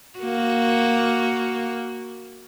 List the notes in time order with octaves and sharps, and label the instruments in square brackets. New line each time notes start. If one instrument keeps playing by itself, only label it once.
[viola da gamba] A#3 F#4